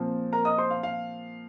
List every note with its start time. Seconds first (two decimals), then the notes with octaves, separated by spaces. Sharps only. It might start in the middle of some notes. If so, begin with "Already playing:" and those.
Already playing: A#2 F3 C4
0.33 A#4 A#5
0.45 D#5 D#6
0.58 C5 C6
0.70 F5
0.83 F5